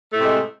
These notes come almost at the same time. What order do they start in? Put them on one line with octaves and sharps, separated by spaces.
A3 A2 C3 G#3